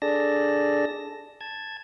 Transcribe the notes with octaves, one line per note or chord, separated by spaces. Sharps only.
D4 G#4 A4 D5 A5 A#6
A5 G#6